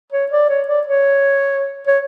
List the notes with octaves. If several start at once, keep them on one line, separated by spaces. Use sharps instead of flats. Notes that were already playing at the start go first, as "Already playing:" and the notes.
C#5
D5
C#5
D5
C#5
C#5